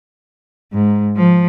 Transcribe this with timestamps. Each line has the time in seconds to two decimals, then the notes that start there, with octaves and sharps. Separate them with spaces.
0.73 G#2
1.16 F3